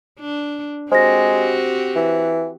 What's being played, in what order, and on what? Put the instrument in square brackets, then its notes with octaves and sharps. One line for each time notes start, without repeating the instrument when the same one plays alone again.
[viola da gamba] D4
[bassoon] G#3 [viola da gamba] C4 F#4 G4 [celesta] C5 A#6
[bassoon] E3